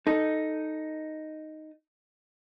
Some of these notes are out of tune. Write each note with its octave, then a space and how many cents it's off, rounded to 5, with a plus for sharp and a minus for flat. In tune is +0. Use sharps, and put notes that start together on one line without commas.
D#4 +0 A4 +0